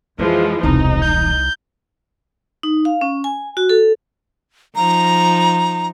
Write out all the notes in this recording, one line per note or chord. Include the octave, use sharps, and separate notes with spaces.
F2 E3 F3 G#3
E1 C2 C3 E3 D#4
G6
D#4
F5
C#4
G#5
F#4
A4
F3 D#4 A#5